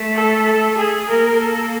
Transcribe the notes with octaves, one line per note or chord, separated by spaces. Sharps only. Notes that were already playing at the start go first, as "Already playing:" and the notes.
Already playing: A3
A4
A4
G#4
A#3 A#4
A4